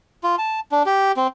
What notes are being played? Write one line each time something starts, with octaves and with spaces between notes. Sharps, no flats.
F4
A5
D4
G4
C4